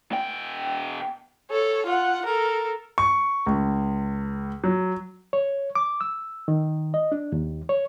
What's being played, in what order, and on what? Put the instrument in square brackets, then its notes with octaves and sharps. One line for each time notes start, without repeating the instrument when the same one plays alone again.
[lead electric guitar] B2 G5
[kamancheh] A4 C#5
F4 F#5
A4 A#4
[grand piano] C#6
C#2
F#3
[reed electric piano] C#5
D6
E6
D#3
D#5
D4
D#2
C#5